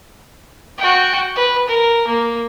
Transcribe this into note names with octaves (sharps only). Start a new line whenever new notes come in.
F#4 G5
B4
A#4
A#3